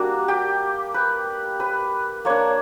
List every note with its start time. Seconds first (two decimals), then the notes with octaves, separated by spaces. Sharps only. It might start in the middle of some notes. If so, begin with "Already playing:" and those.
Already playing: G3 A#3 D4 F#4
0.28 G4
0.94 B4
1.60 B4
2.25 A#3 D4 C#5